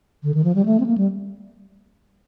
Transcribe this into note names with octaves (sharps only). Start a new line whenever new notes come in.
D3
D#3
F3
G3
A3
C4
A#3
G3